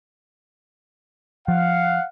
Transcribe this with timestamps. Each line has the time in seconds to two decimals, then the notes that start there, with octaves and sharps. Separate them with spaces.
1.48 F3 F5 F#5